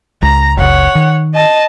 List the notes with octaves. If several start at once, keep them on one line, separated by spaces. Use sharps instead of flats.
C#2 A#5
F#1 C#2 C#5 F#5
D#3
D#5 A5